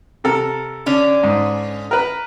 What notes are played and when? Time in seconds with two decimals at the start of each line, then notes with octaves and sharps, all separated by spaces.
0.24 C3 A4 A#4
0.86 D3 C#4 D4
1.24 G#2
1.91 A#4 B4